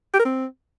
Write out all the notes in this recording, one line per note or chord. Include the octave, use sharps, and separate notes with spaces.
G4
A#4
C4